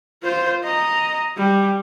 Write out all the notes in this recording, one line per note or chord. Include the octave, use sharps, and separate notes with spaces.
F4 C5
D#5 A#5
G3